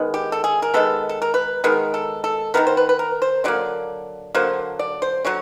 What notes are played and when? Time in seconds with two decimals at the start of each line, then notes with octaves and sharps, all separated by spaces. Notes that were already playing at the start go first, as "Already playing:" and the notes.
Already playing: D#3 G#3 B3
0.14 G4
0.32 A4
0.44 G#4
0.62 A#4
0.74 D#3 G#3 B3 A4
1.09 A4
1.22 A#4
1.34 B4
1.64 D#3 G#3 B3 A#4
1.94 A4
2.24 A4
2.54 D#3 G#3 B3 A#4
2.67 C5
2.77 B4
2.89 B4
2.99 A#4
3.22 C5
3.44 D3 F#3 A#3 D5
4.35 D3 F#3 A#3 C5
4.79 D5
5.02 C5
5.25 D3 F#3 C#5